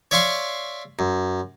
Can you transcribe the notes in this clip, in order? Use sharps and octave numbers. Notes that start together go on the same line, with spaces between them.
C#5 D5 E5 F5 C6 C#6
F#2